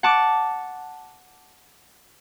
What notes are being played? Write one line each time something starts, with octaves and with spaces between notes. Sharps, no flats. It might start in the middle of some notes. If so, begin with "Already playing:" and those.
F#5 A5 D6